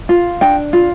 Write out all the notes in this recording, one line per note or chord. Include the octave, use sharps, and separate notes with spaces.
F4
D4 G5
F4